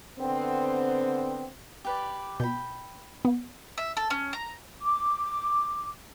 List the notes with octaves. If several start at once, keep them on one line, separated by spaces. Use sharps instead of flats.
D3 B3 C4
G4 B4 D5
B2 G5 B5
B3
E5
A4
C#4
A#5
D6